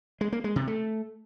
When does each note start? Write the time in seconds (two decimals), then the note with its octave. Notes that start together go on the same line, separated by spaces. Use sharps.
0.21 G#3
0.32 A#3
0.44 G#3
0.56 C3
0.67 A3